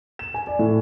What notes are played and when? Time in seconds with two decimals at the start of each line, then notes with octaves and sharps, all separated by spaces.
0.19 E7
0.34 G#5
0.47 D5
0.59 A2